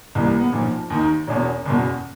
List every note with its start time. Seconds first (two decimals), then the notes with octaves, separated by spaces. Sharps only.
0.15 C2 C3 E3 A#3
0.27 A#3
0.40 B3
0.53 B1 A#2 F3
0.90 D#2 D#3
1.27 E1 E2 B2 C#4
1.65 F#1 E2 B2